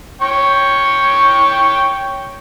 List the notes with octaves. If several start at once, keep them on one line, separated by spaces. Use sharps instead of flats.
C#5 G5 C#6